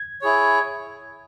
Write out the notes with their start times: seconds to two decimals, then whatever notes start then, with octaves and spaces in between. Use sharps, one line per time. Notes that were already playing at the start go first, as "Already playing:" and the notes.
Already playing: G#6
0.22 E4 G#4 C#5